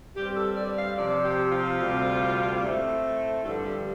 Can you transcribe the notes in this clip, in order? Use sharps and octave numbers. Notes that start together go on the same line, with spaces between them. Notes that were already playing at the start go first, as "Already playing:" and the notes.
G2 G3 C4 G4
A4
D5
F5
C3 F3 C4 D5
G4
F4
D2 C3 G3 C4
A2 A3 C4
G2 D3 F3 A4
G4